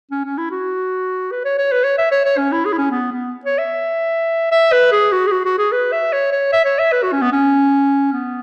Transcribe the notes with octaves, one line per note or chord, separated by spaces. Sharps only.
C#4
C#4
E4
F#4
B4
C#5
C#5
B4
C#5
E5
C#5
C#5
C#4
E4
G#4
E4
C#4
B3
B3
C#5
E5
E5
B4
G#4
F#4
G#4
F#4
F#4
G#4
B4
E5
C#5
C#5
E5
C#5
E5
B4
F#4
C#4
B3
C#4
B3